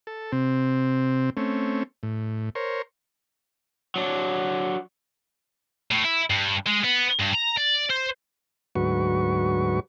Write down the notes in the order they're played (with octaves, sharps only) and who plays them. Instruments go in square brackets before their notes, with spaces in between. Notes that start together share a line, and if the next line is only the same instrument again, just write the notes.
[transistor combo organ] A4
C3 C4
A3 C4 C#4
A2
A#4 C5 C#5
[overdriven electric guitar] F#3 D4
[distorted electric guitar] A2
E4
G2
G#3
B3
G2
A#5
D5
C5
[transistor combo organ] D2 G#2 F#3 F#4 B4 C#6